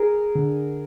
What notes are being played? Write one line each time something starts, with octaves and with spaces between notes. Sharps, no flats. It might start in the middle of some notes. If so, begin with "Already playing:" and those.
Already playing: G#4 A#4
D3